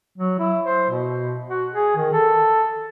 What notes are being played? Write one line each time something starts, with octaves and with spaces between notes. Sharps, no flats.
F#3
E4
C5
B2
F#4
G#4
D#3
A4